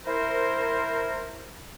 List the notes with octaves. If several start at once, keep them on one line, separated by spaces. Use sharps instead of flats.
E4 A#4 C5